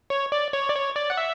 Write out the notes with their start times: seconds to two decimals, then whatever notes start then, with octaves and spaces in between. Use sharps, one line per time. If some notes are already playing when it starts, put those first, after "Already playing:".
0.10 C#5
0.32 D5
0.53 C#5
0.69 D5
0.75 C#5
0.96 D5
1.10 F#5
1.17 E5